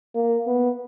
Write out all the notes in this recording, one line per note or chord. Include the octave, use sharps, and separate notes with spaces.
A#3
B3